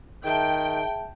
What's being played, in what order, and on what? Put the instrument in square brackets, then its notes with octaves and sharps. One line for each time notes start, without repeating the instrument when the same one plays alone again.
[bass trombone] D#3 [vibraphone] G#4 E5 A5 [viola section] G5